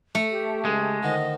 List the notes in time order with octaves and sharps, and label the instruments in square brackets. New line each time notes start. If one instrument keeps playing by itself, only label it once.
[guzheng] A3 [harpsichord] A#5
[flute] G4
[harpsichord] C#2 [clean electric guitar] G#3
[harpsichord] D3 D#3 F3 [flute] D#5